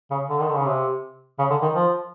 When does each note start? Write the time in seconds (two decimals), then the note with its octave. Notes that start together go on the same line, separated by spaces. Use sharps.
0.11 C#3
0.29 D3
0.40 D#3
0.49 D3
0.57 C#3
0.65 C3
1.39 C#3
1.50 D3
1.62 D#3
1.75 F3